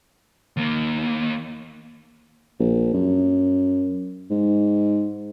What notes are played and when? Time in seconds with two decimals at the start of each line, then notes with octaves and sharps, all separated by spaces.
0.57 D#2 A#3
2.60 A#1
2.94 F#2
4.30 G#2